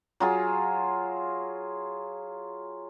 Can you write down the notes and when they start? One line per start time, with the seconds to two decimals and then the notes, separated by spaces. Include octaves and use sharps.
0.20 F#3 F4 G#4